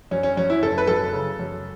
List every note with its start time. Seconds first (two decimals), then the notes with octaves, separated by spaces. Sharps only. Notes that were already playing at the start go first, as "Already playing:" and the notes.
0.11 F#2 C#4
0.23 C#4
0.37 F#2 C#4
0.50 E4
0.62 F#1 A4
0.78 B4
0.87 F#2 A4
1.13 C#3
1.39 F#2